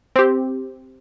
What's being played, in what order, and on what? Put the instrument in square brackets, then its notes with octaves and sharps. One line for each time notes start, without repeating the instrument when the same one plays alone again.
[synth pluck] C4 G4